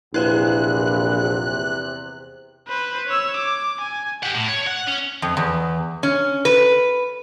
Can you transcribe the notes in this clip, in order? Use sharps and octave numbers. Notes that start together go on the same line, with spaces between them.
A#1 E2 C3 E4 B4 C5 F#6
B4 C5
C#5 E6
D6
G#5
G4 F#5
A2
C#5
F#5
C#4
F2
E2
C#4
B4